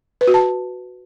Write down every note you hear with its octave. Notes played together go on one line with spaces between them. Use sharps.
B4
F#4
A5